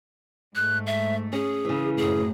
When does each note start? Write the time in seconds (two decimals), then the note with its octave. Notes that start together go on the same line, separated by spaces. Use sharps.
0.56 G#2 A3 F#6
0.87 E5
1.33 C#4 G#4
1.65 C#3 E3
1.98 F#2 A2 G#4